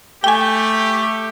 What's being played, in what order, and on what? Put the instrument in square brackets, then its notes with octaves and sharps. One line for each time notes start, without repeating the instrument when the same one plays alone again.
[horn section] A3 G4 [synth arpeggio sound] G5 G#5